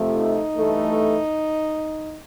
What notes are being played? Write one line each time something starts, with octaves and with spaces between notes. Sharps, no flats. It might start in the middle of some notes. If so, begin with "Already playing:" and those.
Already playing: F2 C3 F3 A3
D#4
G2 E3 A3